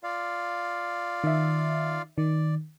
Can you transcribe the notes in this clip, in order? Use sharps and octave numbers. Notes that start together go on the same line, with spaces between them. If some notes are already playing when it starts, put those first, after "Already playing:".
F4 D5 F5
D#3 E5
D#3 D5